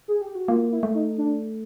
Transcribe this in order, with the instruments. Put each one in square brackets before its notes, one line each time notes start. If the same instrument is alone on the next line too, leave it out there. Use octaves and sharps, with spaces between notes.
[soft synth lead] G#4
G4
F#4
[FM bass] A#3 [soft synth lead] F4
[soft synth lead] E4
[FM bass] A3
[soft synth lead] D#4
D4